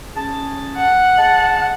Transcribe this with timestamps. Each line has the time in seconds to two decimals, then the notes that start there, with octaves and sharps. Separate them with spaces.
0.16 C#4 G#4 A5
0.77 F#5
1.18 G#4 D#5 A5